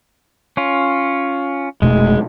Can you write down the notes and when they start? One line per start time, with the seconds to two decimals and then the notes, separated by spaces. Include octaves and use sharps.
0.57 C#4 F4
1.82 F1 B2 G#3 A3